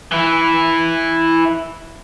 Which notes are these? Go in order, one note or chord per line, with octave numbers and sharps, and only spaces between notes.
E3 E4